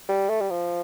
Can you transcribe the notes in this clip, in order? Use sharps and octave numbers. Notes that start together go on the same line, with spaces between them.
G3
A3
G3
F3